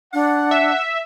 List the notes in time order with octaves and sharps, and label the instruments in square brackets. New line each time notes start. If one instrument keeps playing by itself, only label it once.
[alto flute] D4 [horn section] F#5
[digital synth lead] E5